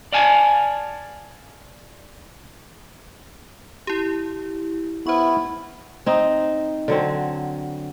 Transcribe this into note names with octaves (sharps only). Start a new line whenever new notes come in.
D5 F5 G#5 A5
E4 G4
B3 E4 C5 C#6
C4 D#4
D3 F#3 C4